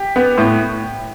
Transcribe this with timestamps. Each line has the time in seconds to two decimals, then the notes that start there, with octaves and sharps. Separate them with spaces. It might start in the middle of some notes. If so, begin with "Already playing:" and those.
Already playing: G4
0.16 B3
0.38 A2